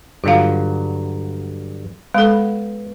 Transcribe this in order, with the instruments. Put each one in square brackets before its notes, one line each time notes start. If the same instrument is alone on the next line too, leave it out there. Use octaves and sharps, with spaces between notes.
[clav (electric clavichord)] G2 D3 F#3 [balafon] F4 F5
[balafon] G#3 A4 [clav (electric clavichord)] B3